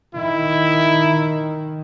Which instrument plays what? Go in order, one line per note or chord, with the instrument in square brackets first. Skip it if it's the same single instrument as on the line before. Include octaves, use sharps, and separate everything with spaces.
[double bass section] D#3 [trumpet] E4